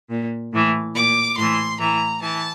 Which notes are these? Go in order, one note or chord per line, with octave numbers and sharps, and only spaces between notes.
A#2
A2 E3
A#2 D6
A2 E3 C6
A2 E3 A#5
E3 A5